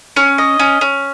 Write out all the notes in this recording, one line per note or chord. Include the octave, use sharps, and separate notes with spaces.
C#4
D#5
C#4
C#4